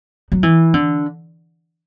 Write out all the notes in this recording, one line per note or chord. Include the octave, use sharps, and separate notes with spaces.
F#3
E3
D3